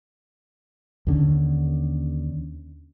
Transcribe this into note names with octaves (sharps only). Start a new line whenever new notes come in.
D#2 D3 C#4